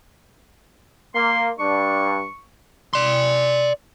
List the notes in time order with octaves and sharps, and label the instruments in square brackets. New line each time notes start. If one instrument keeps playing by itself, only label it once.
[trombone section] A#3 [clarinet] C6
[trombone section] G2 D4 [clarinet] C#6
[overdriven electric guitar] D5 C6